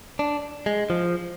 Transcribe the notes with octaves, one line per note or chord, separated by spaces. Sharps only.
D4
G#3
F3